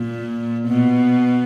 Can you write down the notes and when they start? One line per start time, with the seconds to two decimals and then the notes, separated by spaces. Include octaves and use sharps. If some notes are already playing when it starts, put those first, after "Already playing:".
Already playing: A#2
0.68 B2